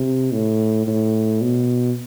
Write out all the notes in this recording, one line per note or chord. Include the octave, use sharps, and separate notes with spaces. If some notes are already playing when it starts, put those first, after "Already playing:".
Already playing: C3
A2
A2
B2